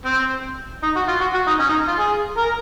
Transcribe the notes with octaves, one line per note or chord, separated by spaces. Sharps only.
C4
D#4
F#4
F4
F#4
F#4
D#4
C#4
D#4
F4
G#4
A#4